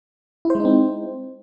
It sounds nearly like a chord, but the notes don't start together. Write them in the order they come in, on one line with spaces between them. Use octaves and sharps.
E4 C5 G#3 D#4 C4